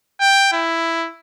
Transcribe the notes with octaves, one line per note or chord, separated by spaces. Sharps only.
G5
E4